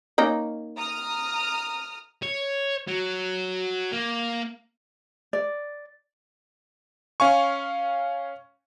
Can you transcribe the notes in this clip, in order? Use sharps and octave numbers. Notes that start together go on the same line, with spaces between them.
A#3 C#4 D#4
A#5 D#6 F6
C#5
F#3
A#3
D5
C#4 F5 G#5 C#6